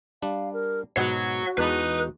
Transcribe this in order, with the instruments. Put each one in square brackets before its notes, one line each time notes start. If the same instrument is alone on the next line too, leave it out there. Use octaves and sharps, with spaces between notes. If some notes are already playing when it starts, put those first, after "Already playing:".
[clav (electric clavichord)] G3 D4 [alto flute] F5
[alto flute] A#4
[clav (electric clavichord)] G#2 B2 B3 [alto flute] F#4 [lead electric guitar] C#5 F#5
[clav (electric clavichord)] E2 G#3 A5 [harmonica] D#4 [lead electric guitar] B4